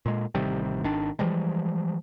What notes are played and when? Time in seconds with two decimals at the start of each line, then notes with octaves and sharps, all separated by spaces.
0.06 A#2 G#3
0.35 A1 C3 D#3 G3
0.83 G#1 D#3 D4
1.19 E3 F3 G3 G#3